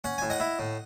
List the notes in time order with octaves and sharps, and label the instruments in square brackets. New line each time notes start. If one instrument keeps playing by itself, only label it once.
[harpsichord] C#4 F#5
A2 G#5
D#5 F#5
E4
A2